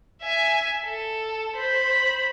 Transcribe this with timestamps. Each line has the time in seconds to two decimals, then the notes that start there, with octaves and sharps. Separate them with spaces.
0.22 E5 G#5
0.83 A4
1.56 C5 B5